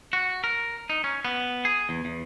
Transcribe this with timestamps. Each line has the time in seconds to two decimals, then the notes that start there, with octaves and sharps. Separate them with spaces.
0.13 F#4
0.44 A#4
0.90 D#4
1.04 C#4
1.25 B3
1.65 G#4
1.89 E2
2.05 E2